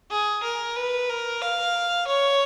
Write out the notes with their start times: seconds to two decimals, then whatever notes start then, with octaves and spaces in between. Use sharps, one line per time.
0.11 G#4
0.43 A#4
0.77 B4
1.09 A#4
1.43 F5
2.07 C#5